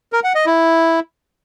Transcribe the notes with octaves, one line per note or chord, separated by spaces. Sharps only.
A#4
F#5
D#5
E4